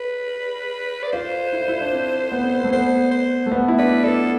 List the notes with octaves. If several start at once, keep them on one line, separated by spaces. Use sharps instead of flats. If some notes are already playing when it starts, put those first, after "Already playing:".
Already playing: B4
D5
F4 C5
E4
F4
E4
D4
C4
B3
C4
B3
A3
B3 C5
C5
A3
B3
E4
D4 B4
D4 A4